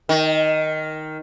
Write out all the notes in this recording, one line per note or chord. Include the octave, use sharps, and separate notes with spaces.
D#3